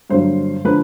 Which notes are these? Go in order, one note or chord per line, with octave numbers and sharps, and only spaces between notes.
G2 D3 F#3 A#3 C5
D3 F3 A#3 D4 B4